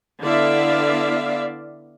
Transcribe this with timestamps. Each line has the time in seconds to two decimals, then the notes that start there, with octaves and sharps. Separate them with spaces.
0.21 D3 B3 E4 D5 E5 F5